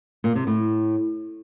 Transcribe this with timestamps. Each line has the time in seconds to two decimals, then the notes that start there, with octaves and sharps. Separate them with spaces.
0.24 A#2
0.35 C3
0.47 A2